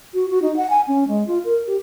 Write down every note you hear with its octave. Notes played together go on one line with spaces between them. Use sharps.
F#4
F#4
D#4
F#5
G#5
C#4
G#3
F4
A#4
G4